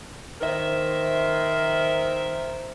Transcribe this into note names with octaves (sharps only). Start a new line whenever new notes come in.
D#3 A#4 C5 E5